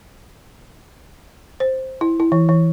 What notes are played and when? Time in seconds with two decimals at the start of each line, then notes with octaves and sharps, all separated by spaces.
1.60 C5
2.01 E4
2.20 E4
2.32 E3
2.49 E3